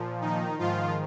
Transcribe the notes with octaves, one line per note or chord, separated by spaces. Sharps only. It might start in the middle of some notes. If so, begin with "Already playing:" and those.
Already playing: A#2 F3
D#3 D#4
G#2 D#3 F3 F4